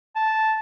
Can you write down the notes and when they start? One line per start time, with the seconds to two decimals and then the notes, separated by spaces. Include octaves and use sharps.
0.16 A5